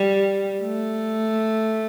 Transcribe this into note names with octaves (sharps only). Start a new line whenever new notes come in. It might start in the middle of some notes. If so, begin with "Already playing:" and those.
Already playing: G3
A3